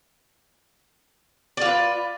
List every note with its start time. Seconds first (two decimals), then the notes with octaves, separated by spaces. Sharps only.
1.57 D5
1.61 F4
1.66 B4